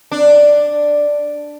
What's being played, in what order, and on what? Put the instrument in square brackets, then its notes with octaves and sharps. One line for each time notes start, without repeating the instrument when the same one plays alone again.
[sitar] D4